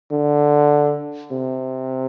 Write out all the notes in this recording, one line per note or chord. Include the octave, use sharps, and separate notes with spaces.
D3
C3